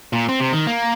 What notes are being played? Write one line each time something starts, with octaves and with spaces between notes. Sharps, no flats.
A#2
C4
C3
D#3
A#3